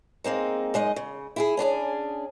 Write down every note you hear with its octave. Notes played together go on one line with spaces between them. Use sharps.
G#3 A#3 C4 D#4
F#2 G#3 D#4 D#5
C#3
E4 G4 G#4
C#4 D4 F#4 G#4